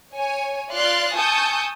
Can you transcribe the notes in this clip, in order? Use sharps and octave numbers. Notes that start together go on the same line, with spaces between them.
C#5 G#5
F4 D5 C6 F6 F#6 A6
G#5 A5 C#6 D#6 E6 G6